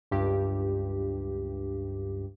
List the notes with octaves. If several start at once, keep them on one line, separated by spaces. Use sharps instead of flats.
C#2 G2 G4